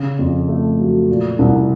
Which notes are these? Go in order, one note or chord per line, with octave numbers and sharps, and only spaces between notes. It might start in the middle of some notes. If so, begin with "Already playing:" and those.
Already playing: C#3
F2
A3
F#3
A#2
C2